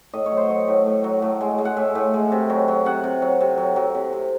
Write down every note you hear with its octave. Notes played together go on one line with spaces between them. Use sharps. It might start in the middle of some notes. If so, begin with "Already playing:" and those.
A2 D#5
C#5
F#3
C5
F#3 C#5
A2
A2
F#3
A2
G#3
G#3
F#5
A2 E5
A2
G#3
C3
F#3
F#3
C3 F#5
C3
F#3
C3
F#3
F#3
C3
C3